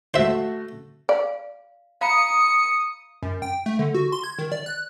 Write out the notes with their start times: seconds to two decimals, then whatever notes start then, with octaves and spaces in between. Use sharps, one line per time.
0.14 A3 F#4 C5 E5
1.09 D5 F5
2.01 F5 A#5 B5 D#6 C#7
3.23 F#2
3.42 G5
3.66 A3
3.79 D3
3.95 F#4
4.12 C6
4.24 G#6
4.39 D#3
4.52 D5
4.66 F#6